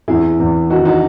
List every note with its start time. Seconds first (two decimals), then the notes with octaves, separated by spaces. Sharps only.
0.08 E2 E4 G#4
0.39 E2
0.70 D#3 D#4 F#4
0.85 D#4 F#4